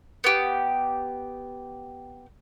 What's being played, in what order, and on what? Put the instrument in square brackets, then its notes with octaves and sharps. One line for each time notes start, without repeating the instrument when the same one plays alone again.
[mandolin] B3 G4